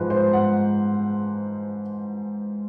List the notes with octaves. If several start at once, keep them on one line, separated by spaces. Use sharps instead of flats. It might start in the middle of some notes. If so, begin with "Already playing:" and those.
Already playing: G#2 F3 G#3 B4 C5
C5
F#5